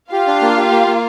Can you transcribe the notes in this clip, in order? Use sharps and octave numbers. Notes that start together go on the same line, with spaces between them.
F4 G4 F5
D4
A#3
G4
A#3
A#3